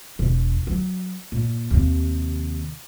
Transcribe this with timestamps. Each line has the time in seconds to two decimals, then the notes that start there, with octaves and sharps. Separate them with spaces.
0.19 E1
0.67 F#3
1.32 A#2
1.71 D#2 C3